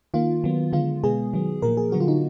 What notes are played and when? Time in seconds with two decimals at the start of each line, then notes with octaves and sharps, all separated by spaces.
0.14 D#3 A#3 F4
0.44 D#3 F#3 B3
0.73 D3 G#3 B3 F4
1.03 B2 G#3 B3 G#4
1.33 D#3 F#3 B3
1.62 A#2 F3 A#3 A#4
1.77 G#4
1.92 D3 F#3 B3 F#4
2.00 F4
2.08 D#4